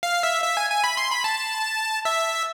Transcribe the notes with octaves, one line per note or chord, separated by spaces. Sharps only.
F5
E5
E5
G#5
G#5
B5
C6
B5
A5
E5